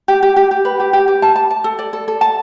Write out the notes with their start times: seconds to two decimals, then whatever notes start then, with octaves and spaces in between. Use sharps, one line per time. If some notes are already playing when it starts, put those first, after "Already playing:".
0.08 G4
0.23 G4
0.36 G4
0.51 G4
0.65 B4
0.80 G4
0.93 G4
1.08 G4
1.22 A5
1.36 A5
1.51 A5
1.64 A4
1.79 D5
1.93 A4
2.08 A4
2.21 A5